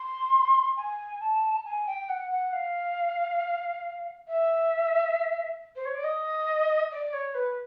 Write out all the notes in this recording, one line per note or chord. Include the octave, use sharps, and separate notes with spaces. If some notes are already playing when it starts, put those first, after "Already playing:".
Already playing: C6
G#5
A5
G#5
G5
F#5
F#5
F5
E5
C5
C#5
D5
D#5
D5
C#5
B4